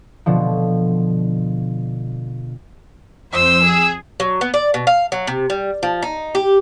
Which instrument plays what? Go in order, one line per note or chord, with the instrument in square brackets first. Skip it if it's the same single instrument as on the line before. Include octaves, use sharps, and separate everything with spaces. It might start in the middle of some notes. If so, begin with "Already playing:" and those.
[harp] B2 D3 F3
[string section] F2 C5 [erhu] E6
[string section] G#4
[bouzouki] F#3
B3
D5
B2
F5
F#3
C3
G3
F3
D#4
G4